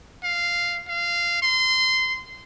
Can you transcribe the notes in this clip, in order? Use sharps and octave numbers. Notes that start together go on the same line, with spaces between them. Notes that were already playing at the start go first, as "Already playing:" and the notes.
F5
F5
C6